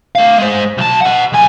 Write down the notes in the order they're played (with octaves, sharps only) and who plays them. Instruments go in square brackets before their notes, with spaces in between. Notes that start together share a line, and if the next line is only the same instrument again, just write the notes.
[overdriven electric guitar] A3 F5
G#3 C5
B1 A5
D#5 F#5
B1 G#5